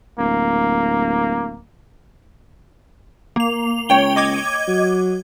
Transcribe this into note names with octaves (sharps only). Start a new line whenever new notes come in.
D1 A#3
A#3 F7
C#2 C#5 G5 G7
D#5 D6 G#6
F#3